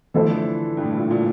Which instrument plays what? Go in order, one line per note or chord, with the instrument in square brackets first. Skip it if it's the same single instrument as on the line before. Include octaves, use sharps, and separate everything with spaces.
[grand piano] E3 [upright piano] F3 A3 E4 A4 C5
[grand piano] D3
E3
G2
A2
A#2
A#2